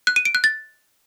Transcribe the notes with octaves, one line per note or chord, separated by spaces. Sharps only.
F#6
D#7
D7
F#6
A6